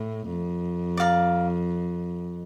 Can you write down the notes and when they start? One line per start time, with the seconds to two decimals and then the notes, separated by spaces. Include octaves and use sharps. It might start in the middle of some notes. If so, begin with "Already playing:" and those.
Already playing: A2
0.28 F2
0.97 D5 F5 A#5